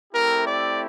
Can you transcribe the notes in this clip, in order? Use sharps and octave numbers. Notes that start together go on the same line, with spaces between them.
A3 C4 E4 G4 A#4
D5